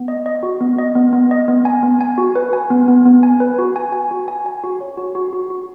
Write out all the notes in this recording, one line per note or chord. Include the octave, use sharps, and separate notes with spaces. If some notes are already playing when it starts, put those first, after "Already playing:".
Already playing: B3
D#5
D#5
F#4
B3
D#5
B3
B3
D#5
B3
G#5
B3
G#5
F#4
B4
G#5
B3
B3
B3
G#5
B4
F#4
G#5
G#5
F#4
G#5
G#5
F#4
C#5
F#4
F#4
F#4
F#4